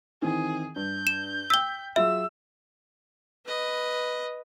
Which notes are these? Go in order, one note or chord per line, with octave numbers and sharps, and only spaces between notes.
D#3 E3 C4 G#4
G2 G6
E7
G5 E6 B6 G7
F#3 F4 G#4 E5 E6
B4 D#5